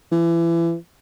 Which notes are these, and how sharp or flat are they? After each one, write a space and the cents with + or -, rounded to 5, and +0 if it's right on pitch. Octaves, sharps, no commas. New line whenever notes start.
E3 +30